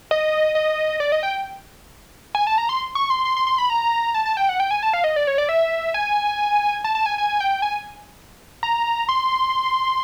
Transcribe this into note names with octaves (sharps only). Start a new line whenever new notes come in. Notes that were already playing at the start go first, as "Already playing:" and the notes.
D#5
D#5
D5
D#5
G5
G#5
A5
A#5
C6
C#6
C6
C6
C6
C6
B5
A#5
A5
A5
G5
F#5
G5
G#5
A5
F5
D#5
D5
C#5
D5
E5
G#5
A5
A5
G#5
G#5
G#5
G5
G5
G#5
A#5
C6